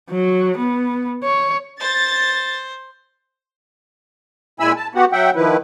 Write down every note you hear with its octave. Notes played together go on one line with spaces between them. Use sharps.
F#3
B3
C#5
C5 A6
A#2 G#3 E4 G#5 B5 E6
A5
B3 F#4 G4 F#5
F#3 E5 F#5 G5
D#3 F3 E4 B4